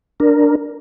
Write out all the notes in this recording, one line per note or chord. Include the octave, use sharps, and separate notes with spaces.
D4 A#4